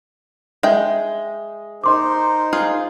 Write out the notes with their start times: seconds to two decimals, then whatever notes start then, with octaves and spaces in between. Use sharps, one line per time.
0.63 G#3 E5 G5
1.84 D#4 A#4 C5 D#5 C6 D6
2.53 F4 G#4